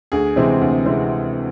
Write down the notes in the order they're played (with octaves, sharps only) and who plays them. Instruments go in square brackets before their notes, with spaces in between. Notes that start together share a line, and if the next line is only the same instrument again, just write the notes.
[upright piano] D2 G#4
C3 E3 G#3 C4
D2
C3 E3 G#3 C4